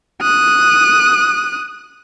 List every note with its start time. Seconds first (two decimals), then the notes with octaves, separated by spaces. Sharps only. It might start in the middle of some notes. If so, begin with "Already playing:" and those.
0.22 D#6 F#6